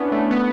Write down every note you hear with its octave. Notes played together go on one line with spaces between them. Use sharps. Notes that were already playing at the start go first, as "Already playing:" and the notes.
Already playing: B3 C#4 D4 E4
A3
B3